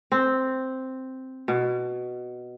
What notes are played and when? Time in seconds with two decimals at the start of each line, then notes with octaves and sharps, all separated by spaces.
0.12 C4
1.48 B2